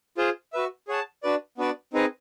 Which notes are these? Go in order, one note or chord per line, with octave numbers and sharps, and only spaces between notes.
F4 G#4 C5
F#4 B4 E5
G#4 C#5 F#5 A5
D4 F#4 B4 D5
B3 D4 F#4 B4 D5
C4 D#4 G#4 B4 D#5